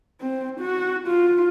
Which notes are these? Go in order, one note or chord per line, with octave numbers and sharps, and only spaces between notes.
C4
F#4
F4